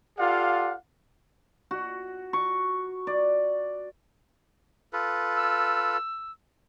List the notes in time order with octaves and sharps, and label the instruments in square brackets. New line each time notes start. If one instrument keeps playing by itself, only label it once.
[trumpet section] F4 G4 A4 D5 F5 F#5
[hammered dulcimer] F#4
C#6
D5
[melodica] F4 A4 B4
[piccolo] E6